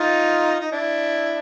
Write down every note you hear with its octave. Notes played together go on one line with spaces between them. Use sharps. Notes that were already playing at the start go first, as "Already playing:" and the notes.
Already playing: D#4 F4
D#4
D4 E4